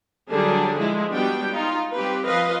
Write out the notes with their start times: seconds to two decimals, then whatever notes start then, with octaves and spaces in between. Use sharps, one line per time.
0.30 D3 F#3 G3 D4 G#4
0.77 F3 G#3 E4
1.13 G3 B3 D4 F#4 G5
1.54 D#4 F4
1.95 G3 C4 G4 B4
2.26 F3 B4 D#5 F5